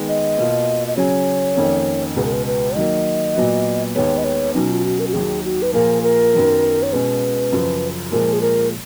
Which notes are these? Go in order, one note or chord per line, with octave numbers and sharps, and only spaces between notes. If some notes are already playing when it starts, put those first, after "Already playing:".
Already playing: D#3 G#3 B3
D#5
B2 A#3 F4
D#5
C#3 F#3 C#4 G#4 C#5
F2 D#3 A#3 C#4
C#2 B2 G#3 B4
A#4
B4
B4
D#3 F#3 A#3 D#5
A#2 F#3 B3 F#4
D#2 D#3 G#3 B3 C#5
D#5
C#5
B2 F#3 C#4 D#4
F4
F#4
A#4
F#4
D#2 D#3 F#3 G#4
F#4
B4
A#2 F3 A#3 F4 G#4 A#4
A#4
F#2 D#3 F#3 B3
C#5
B2 G#3 C#4 B4
F#2 C#3 F3
A#2 F3 G#3 A#4
G#4
A#4